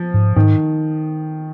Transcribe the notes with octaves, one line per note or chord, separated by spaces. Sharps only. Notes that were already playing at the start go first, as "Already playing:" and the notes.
Already playing: F3
G#2
G#2 D#3